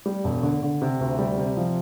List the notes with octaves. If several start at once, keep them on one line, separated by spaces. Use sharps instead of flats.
G3
E1
D3
D3
C3
D2
G3
C3
F3